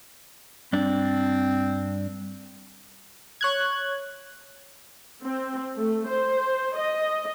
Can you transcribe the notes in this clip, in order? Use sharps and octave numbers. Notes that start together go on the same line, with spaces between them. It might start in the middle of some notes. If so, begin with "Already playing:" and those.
G2 C4 D4
C#5 F#6 G#6
C4
A3
C5
D#5